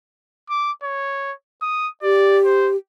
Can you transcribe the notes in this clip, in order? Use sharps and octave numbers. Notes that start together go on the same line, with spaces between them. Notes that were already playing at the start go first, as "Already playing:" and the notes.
D6
C#5
D#6
G4 D5
C5